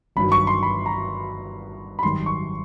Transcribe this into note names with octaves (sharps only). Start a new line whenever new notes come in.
G1 G2 D#3 F#3 B5
C#6
C6
B5
A#5
B5
G#1 F#2 D#3 G3 C6
C#6